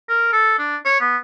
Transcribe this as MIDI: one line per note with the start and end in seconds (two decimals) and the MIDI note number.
0.09 0.32 70
0.33 0.56 69
0.59 0.77 62
0.85 1.00 73
1.00 1.17 59